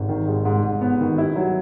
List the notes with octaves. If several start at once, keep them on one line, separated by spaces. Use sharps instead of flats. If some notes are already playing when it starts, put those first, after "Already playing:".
Already playing: G#1
D#3
G#2
G#2
G#2
B3
D#3
E4
F#3